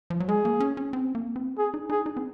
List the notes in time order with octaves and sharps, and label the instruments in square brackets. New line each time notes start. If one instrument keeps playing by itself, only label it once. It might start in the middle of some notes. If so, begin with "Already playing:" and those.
[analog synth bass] F3
F#3
[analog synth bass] G#3 [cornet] G#4
[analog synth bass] A#3
C#4
C#4
C4
A#3
C4
[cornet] G#4
[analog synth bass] D#4
[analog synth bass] D#4 [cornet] G#4
[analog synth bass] D#4
C4